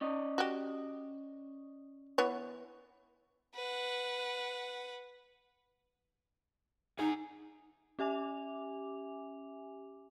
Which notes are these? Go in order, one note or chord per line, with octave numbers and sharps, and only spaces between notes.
C#4 D5 D#5
F#4 G4
E3 B3 C#5
B4 F#5
D#4 G#4 F#5 G#5
C#4 G4 E5 G#5 D6 F7